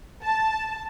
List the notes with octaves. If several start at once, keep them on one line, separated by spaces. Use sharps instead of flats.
A5